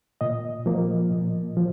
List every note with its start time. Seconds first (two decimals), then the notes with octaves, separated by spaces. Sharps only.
0.21 A#2 D#5
0.66 F3 A#3
1.11 A#2
1.57 F3